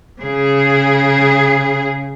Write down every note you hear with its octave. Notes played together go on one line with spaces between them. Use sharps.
C#3 G#4